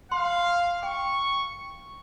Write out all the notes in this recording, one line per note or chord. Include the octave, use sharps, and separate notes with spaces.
F5 C6
G5 C#6